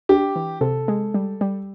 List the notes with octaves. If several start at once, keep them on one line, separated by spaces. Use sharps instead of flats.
D4 G4
E3
C3 A4
G#3
G3
G3